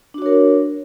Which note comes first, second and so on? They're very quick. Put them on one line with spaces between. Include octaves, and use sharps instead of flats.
D4 F#4 C#5 A#4